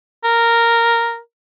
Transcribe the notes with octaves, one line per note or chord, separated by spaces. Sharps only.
A#4